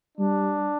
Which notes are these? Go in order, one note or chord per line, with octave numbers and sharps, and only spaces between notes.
G3 D4